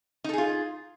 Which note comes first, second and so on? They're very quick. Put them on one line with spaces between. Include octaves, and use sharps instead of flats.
D#4 A4 G#4 F4